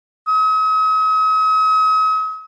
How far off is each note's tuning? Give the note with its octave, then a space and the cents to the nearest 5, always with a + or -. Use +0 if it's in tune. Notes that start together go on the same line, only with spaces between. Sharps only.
D#6 +45